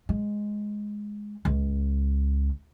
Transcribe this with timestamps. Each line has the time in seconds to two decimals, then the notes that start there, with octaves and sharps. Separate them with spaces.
0.09 G#3
1.45 C#2